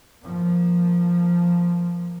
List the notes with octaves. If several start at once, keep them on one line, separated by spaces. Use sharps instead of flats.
F3 A#3